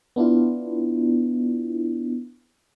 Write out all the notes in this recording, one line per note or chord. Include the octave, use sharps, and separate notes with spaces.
B3 D4 E4 F4